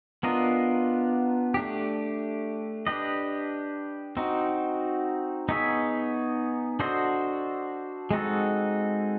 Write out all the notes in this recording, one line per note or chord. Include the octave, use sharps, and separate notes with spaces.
B3 D4 F4 A#4 D#5
A3 D4 G4
D4 G4 B4 D#5
C4 D#4 F#4
B3 D#4 G#4 C#5 E5
D4 F#4 A4 C5 D#5
G#3 C4 D#4 F#4 A4